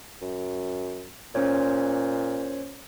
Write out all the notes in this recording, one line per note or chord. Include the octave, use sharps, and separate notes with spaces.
F#2
A#2 C#4 C5 C#5